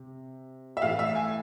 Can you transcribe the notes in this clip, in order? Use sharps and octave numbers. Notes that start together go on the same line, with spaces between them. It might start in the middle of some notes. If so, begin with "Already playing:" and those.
Already playing: C3
E5
A2 E3 F5
E5
G#5